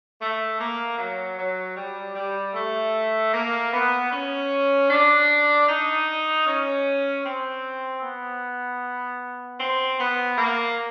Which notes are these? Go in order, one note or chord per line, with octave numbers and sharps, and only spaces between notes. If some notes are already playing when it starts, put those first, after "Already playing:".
A3
A#3
F#3
F#3
G3
G3
A3
A#3
B3
C#4
D4
D#4
C#4
C4
B3
C4
B3
A#3